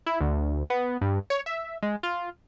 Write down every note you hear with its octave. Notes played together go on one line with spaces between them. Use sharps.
E4
D2
B3
G2
C#5
E5
G#3
F4